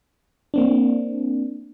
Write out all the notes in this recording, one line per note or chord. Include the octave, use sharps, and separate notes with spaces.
A#3 C4 D4